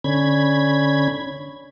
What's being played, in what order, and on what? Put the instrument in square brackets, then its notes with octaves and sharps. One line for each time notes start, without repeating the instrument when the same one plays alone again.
[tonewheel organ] D3 C#4 B5 G#6